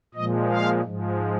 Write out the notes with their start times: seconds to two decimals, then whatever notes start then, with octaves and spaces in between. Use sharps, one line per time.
0.15 A#2 F3 G#3 D#5
0.49 F5
0.84 G#2 F3 G#3